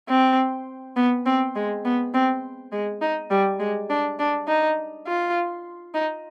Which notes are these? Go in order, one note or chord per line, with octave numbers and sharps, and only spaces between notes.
C4
B3
C4
G#3
B3
C4
G#3
D#4
G3
G#3
D4
D4
D#4
F4
D#4